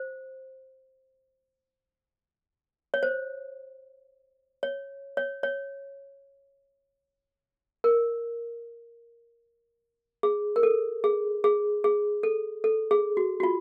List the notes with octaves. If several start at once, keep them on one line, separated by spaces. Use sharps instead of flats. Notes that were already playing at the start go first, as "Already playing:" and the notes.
Already playing: C5
C#5
C5
C#5
C#5
C#5
A#4
G#4
A#4
A4
G#4
G#4
G#4
A4
A4
G#4
F#4
F#4
F4